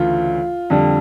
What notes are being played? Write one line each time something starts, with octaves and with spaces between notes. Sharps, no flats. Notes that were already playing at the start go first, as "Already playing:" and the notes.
Already playing: D2 C#3 E3 A3 F4
F2 D3 G3